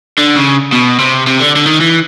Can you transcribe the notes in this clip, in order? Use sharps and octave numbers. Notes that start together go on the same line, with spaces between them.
D3
C#3
B2
C3
C3
D3
D3
D#3
E3